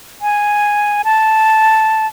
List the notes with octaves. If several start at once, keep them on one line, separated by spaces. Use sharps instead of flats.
G#5
A5